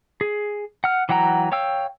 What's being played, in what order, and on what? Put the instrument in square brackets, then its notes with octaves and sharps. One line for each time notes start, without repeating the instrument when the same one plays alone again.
[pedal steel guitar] G#4
F#5 F6
E3 F#3 F#5 G5 A#5
C#5 F5 G5 E6